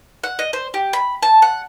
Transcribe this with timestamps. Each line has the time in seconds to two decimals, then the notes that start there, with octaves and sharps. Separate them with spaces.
0.24 F#5
0.39 D#5
0.53 C5
0.74 G4
0.93 B5
1.23 A5
1.42 F#5